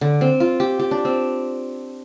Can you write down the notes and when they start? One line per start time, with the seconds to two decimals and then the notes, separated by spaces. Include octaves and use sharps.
0.01 D3
0.21 C4
0.40 F4
0.60 G4
0.79 G4
0.91 D4
1.05 C4